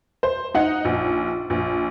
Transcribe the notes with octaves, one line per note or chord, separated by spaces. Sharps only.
C5
D#4 F#5
A#1
A#1